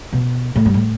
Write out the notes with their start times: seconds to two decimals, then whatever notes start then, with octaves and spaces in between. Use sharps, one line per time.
0.13 B2
0.56 A2
0.65 G2
0.74 A2